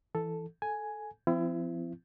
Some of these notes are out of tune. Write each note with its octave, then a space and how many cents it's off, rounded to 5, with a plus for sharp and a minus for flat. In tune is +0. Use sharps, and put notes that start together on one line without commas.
E3 +0 A4 +0
A4 -10 G#5 +5
F3 -30 C4 -30 E4 +30